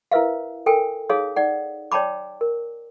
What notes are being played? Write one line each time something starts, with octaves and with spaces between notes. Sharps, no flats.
E4 A#4 B4 E5 F5
A4 A#4 G5 G#5
D#4 G#4 C#5 F5 D#6
D#4 D5 F#5
C#5 D5 G5 A5 B5 D6
A#4